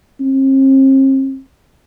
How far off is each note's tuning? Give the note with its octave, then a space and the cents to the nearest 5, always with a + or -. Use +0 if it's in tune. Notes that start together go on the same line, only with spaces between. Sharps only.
C4 +40